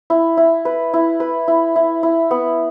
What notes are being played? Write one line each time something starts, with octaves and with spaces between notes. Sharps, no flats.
E4
E4
B4
E4
B4
E4
E4
E4
B3